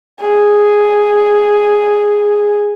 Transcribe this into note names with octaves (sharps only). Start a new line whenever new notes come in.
G#4